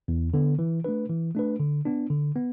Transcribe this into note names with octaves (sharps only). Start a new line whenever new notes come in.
E2
D3 B3
E3
A3 D4 B4
E3
A3 D4 B4
D3
B3 D4
D3
B3